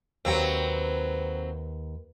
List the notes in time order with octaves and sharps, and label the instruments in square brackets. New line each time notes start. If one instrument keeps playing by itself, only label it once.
[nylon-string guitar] D#2 G5 [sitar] F#3 C4 [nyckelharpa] B4